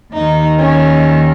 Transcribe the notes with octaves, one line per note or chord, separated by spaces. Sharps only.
D#2 D#3 D#4
C#4